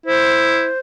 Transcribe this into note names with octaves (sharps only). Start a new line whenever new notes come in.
E4 C5